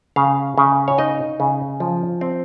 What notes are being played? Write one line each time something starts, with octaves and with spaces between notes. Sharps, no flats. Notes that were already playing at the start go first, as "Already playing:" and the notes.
C#3 F5
C#3
C#5
D#4 D#5
C#3
F3
C4